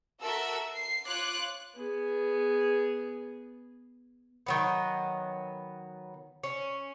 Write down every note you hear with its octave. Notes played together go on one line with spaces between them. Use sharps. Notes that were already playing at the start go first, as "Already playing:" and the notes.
F#4 A4 A#4 E5 E6
C7
F4 C#5 D6 F#6
B3 G#4
D#3 F#3 B3
C#4